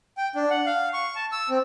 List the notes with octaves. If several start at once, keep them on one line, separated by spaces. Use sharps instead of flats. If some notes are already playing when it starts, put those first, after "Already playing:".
G5
D4
F#5
F5
C#6
A5
E6
C4